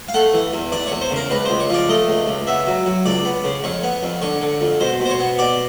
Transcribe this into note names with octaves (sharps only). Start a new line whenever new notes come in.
F5
A3 F#5
E3
E2
E3 D5
C#5
E2
C5
C#3
A#4
C#2 B4
C#2 C5
C#5
F3 D5
A3 D#5
C#2
C#2
B3 E5
F#3
F#3
C#2 D5
B3
C#3
F2 C#5
B3
F2
D3 C#5
D3
F2
B2 C5
B2
C5
C#5
B3
B2 D5